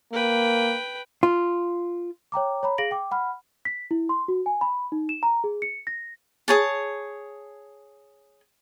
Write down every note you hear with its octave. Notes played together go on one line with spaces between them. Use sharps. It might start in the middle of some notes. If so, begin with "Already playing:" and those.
A#3 B4 G5
F4
C#5 G5 A#5 D6
C#5 A#5 B5
G#4 F5 A#6 D7 F#7
G5 D6
F#5 B5 F6
B6
E4
C6
F#4
G#5
B5
D#4
E7
A#5
G#4
C#7
A#6
G#4 C#5 A5